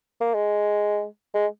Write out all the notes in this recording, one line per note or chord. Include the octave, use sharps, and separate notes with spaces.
A#3
G#3
G#3